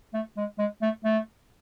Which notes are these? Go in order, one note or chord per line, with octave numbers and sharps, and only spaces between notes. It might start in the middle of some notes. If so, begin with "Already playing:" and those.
A3
G#3
G#3
A3
A3